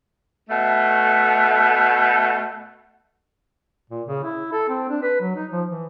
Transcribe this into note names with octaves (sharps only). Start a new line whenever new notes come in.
B2 A3
A#2
C#3
E4
A4
C4
D4
B4
F#3
D#4
F3
E3